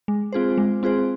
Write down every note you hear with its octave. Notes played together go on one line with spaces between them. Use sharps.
G#3
C4 F4 G#4 C5
G#3
C4 F4 G#4 C5